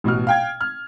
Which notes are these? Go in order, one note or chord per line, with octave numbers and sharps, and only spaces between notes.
A1 B2 F#4 F6
F5 G5 G#6
F6